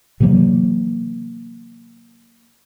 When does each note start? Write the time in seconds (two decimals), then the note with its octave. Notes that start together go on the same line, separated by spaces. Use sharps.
0.20 C3 E3 F#3 A#3